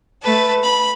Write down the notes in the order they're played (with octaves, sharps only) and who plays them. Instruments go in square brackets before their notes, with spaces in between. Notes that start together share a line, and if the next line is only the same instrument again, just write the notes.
[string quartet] A3 B4 A5
B5